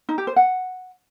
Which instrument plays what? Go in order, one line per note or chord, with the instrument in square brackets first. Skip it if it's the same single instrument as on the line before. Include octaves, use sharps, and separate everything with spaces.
[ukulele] D#4
G4
C5
F#5